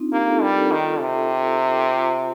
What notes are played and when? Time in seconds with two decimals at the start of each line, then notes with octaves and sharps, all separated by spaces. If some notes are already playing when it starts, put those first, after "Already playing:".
Already playing: C4 D4 D#4 F4
0.12 A#3 D#4 G4
0.27 F4 A4
0.42 G3 G4 A#4
0.51 A4
0.57 G4 A#4
0.72 D#3 F4 A4
1.01 C3
1.90 F4